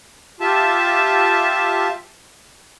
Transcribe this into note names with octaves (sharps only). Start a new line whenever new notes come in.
F4 G4 E5 A5